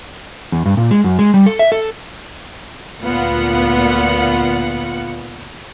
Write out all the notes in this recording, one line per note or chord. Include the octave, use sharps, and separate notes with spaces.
E2
G2
A#2
G#3
F#2
G#3
G3
A4
E5
A4
D2 A#2 B3 F4 F#5 C#7